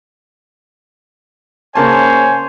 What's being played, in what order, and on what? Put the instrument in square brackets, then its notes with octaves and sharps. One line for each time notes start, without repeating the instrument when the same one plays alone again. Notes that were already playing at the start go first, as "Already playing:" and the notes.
[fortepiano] C#3 A#3 A5 [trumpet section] C5 C#5 G#5